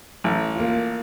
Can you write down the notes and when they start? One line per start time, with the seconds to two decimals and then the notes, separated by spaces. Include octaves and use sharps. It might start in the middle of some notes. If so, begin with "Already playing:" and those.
0.24 A1
0.55 A#3 F4